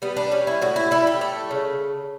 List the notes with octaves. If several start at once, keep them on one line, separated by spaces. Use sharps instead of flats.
G3 B3
D4
G3 C#4
E4
A2 F#4
E4
G3 E4
G4
A3 A4
C#3